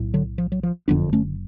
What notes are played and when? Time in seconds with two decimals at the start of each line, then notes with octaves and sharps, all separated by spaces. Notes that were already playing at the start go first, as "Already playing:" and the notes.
Already playing: B1 A2
0.14 D3 F#3
0.38 F3
0.52 F#3
0.63 F3
0.88 F#1 F2 D3 B3 D4
1.13 A3 C#4